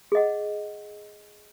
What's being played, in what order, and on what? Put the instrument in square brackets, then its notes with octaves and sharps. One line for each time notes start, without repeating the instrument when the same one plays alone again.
[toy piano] G#4 D#5 F#5